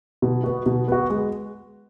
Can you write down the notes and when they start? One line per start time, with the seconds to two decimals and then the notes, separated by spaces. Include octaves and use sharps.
0.22 B2
0.44 B3 F#4
0.66 B2
0.88 B3 F#4
1.10 G#3